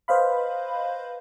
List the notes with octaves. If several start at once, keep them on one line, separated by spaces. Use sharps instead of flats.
B4 C5 D#5 F5 B5